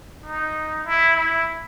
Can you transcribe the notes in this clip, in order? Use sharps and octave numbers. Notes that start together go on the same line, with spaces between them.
D#4
E4
E4